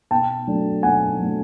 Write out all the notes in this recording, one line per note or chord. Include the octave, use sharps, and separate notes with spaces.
B2 G5 A5
F#3 A3 D4
B2 F#5 G#5
F#3 A3 D4